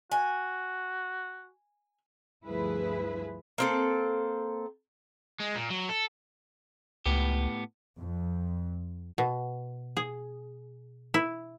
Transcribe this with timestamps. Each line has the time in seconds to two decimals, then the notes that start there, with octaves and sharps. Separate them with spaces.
0.11 F#4 G#5
2.46 D2 G2 F3 E4 G#4 B4
3.58 A#3 C4 A4
5.40 G#3
5.55 A#2
5.70 F#3
5.89 A4
7.06 C#2 A2 B3 G4
7.97 F2
9.18 B2
9.97 G#4
11.14 E4